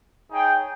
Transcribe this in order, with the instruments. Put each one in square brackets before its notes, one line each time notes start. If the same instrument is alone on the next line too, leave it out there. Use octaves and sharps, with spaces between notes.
[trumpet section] D#4 G#4 C#5 G5